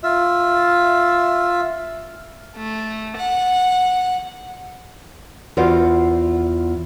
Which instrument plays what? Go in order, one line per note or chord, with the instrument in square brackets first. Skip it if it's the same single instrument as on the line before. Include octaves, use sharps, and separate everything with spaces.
[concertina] F4 E5
[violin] A3
F#5
[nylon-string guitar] E2 F4 F#4 C5 D5